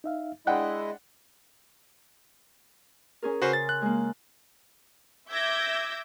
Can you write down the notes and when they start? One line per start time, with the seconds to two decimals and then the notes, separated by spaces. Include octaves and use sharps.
0.04 D#4 E5 F5
0.47 G#3 D4 E4 D#5 F#5 G5 F#6
3.23 C#4 G#4 A#4
3.42 C#3 F#4 B4 C5 C6 F6
3.53 A6
3.69 F#6
3.82 G#3 A#3
5.28 E5 D6 E6 G6 G#6 A#6